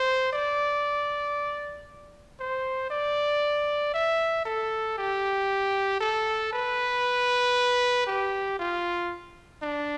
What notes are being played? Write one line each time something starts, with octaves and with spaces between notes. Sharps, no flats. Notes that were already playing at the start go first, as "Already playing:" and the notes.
Already playing: C5
D5
C5
D5
E5
A4
G4
A4
B4
G4
F4
D4